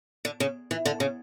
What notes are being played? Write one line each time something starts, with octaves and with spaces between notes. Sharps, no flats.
D3
C#3
E3
D3
C#3